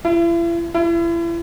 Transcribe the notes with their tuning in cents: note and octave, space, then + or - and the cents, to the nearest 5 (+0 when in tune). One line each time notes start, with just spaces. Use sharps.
E4 +40
E4 +35